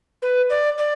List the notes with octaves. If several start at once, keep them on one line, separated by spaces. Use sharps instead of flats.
B4
D5
D5